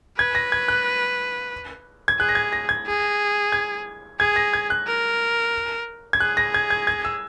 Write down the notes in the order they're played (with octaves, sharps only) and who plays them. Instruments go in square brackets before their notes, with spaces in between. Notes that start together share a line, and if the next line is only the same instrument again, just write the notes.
[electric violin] B4 [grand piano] G#6
[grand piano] A#6
G#6
F#6
G#6
[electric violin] G#4 [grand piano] F#6
[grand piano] A#6
G#6
A#6
G#6
[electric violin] G#4
[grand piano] G#6
[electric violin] G#4 [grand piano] G#6
[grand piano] A#6
G#6
F#6
[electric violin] A#4
[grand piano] G#6
[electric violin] G#4 [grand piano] F#6
[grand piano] A#6
G#6
G#6
G#6
E6